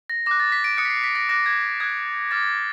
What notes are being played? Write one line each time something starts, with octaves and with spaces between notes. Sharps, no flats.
A#6
D6 F#6 A#6
A6
B6
D7
D#6 F#6 C#7
B6
C7
B6
A#6
D6 F#6 A#6
G#6
D#6 F#6 G#6
D6 F6 A6